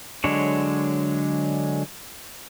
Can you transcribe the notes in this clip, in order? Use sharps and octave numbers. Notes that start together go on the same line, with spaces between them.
D3 F#3 G#3 D4 C#5